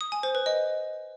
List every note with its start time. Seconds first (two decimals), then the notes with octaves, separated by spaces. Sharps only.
0.01 D#6
0.12 G#5
0.23 C5
0.35 B4
0.46 D#5